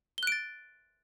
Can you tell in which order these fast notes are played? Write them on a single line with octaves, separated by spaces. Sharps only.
G7 F#6 D7 A6